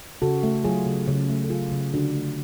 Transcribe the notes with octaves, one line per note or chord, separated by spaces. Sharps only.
C#3 F#4 A4
A3
F#3 F4 G#4
C#3
C#3
A3
A4
F#3 F4 G#4
C#3
D3 D4 F#4
A3